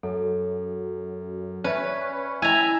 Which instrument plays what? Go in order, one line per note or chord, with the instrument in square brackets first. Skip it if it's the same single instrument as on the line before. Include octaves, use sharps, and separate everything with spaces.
[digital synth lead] F#2 [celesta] A4
[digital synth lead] C#4 [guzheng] B4 [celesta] D5 E5
[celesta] E4 D#5 G5 [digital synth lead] E5 [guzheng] G#5 A#5